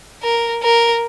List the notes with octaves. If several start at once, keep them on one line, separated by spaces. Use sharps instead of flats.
A#4
A#4